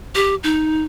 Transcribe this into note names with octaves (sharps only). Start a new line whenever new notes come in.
G4
D#4